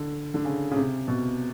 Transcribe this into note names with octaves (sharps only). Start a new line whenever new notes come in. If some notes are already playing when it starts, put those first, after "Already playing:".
Already playing: D3
D3
C#3
C#3
C3
B2